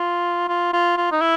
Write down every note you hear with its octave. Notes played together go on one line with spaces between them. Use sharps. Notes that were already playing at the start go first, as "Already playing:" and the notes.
Already playing: F4
F4
F4
F4
D#4
E4